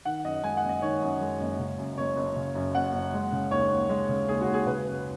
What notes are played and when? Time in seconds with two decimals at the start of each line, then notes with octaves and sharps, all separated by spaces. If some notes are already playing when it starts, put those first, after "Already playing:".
0.05 D#3 F#5
0.24 F#2 D#5
0.43 G#3 G#5
0.57 F#5
0.63 F#1
0.69 D#5
0.82 D#3 C#5
1.02 F#2
1.21 G#3
1.40 F#1
1.59 C#3
1.78 F#2
1.98 F#1 C#5
2.17 F#1
2.36 C#3
2.55 F#2
2.75 F#1 F#5
2.94 F#1
3.13 G#3
3.32 C#3
3.51 D#2 C#5
3.70 D#2
3.89 G#3
4.09 C#3
4.28 D#2 G#4
4.41 F#4
4.47 D#2
4.54 G#4
4.67 C#3 B4
4.86 F#2